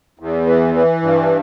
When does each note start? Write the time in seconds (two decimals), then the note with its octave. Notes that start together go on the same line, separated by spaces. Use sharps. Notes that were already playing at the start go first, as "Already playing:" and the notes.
0.20 E2
0.46 E3
0.74 E3
1.02 G2